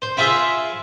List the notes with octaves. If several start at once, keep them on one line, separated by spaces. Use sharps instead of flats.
C5
E4 F4 G#4 C5 E5